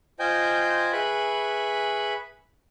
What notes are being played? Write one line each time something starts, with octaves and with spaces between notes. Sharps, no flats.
F4 C5 D#5 G5 G#5 G6
G#4 B4 E5 B5 C#6 F#6